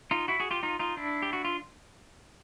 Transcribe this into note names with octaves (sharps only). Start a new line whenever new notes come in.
D#4 F4
E4 F#4
F#4 G#4
F4 G4
D#4 F4
D#4 F4
D4 E4
G4
F#4
F4